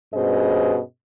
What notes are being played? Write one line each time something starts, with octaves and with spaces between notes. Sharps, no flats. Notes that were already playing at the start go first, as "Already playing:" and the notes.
G2 B2 C#4 G#4 C5 D#5